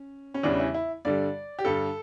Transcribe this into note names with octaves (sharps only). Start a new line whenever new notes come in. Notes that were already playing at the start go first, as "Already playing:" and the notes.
Already playing: C#4
C#4
E2 C#3 E3 G3 D4
E4
E4
G2 D3 G3 D5
G4
G2 D3 G3 A4